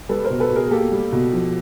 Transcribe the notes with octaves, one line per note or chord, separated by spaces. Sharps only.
G3 A4 B4
A#4 C5
B2
A4 B4
B2
G#4 A#4
A#3 G4 A4
G3
B2
F3